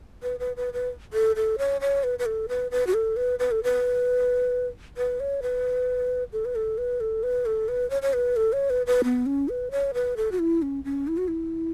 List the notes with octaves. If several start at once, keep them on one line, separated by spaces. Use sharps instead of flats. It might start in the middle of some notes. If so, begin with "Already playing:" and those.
B4
B4
B4
B4
A4
A4
C#5
C#5
B4
B4
A4
B4
B4
F#4
A4
B4
B4
A4
B4
B4
C#5
B4
A4
B4
A4
B4
A4
B4
A4
B4
C#5
C#5
B4
A4
C#5
B4
B4
B3
C#4
B4
C#5
B4
A4
F#4
E4
C#4
C#4
E4
F#4
E4